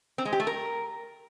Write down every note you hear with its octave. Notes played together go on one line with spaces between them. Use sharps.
C4
G#3
G4
A3
A#4